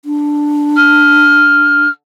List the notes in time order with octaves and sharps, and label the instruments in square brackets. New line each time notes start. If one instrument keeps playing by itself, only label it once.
[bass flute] D4
[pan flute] F6